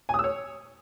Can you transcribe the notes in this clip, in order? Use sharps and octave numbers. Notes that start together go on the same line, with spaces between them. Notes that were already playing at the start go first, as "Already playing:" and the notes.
G#5
D#6
E6
C#5